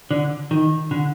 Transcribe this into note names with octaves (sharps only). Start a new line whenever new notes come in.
D3
D#3
D3